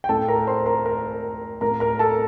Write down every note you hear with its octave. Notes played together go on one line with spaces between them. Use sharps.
G5
A2 A4 A5
A#4 A#5
C5 C6
A#4 A#5
A#4 A#5
A2 A#4 A#5
A#4 A#5
A4 A5